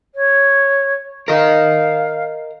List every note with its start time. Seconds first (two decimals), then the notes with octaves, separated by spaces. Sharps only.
0.14 C#5
1.28 A#4 D#5 F5